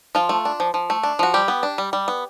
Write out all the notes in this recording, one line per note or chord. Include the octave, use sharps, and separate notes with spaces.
F3 F4
A3
D4
F3
F3
A3
D4
F3 F#4
G3 G4
B3
D4
G3
G3
B3